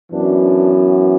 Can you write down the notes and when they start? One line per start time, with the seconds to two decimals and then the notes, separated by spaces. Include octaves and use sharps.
0.11 F#2 E3 B3 D4
0.42 D4